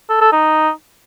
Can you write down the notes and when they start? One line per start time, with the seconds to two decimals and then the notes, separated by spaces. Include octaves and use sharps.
0.10 A4
0.21 A4
0.32 D#4